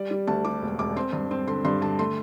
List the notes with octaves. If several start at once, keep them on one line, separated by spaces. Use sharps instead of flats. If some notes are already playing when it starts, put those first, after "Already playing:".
Already playing: G3 D5
G3
D2 A5
G3 D6
E1
E1 D6
C4 C6
G2
C4
D3 C6
G2 C6
D3 A5
A3 C6